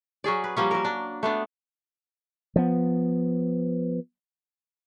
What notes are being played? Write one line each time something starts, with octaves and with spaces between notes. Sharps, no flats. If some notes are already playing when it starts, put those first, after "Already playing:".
F#3 C#4 G#4 D5
B4
F3 G3 A#3 C#4
F#3 A#4
D4
A3 B3 D4
F3 B3